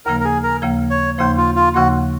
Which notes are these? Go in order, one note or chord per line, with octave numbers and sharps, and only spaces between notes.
D#2 C#3 F3 A#3 A#4
A#4
G#4
A#4
D#2 C#3 F3 A#3
C#5
D#2 C#3 F3 A#3 C5
F4
F4
D#2 C#3 F3 A#3 F#4